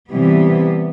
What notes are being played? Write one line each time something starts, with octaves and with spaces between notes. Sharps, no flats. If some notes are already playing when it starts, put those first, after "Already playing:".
C3 E3 G3 B3